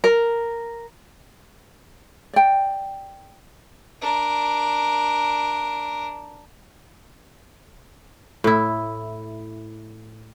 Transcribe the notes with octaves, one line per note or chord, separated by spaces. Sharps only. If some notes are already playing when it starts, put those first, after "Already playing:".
A#4
D5 G5
D4 A#4
A2 E4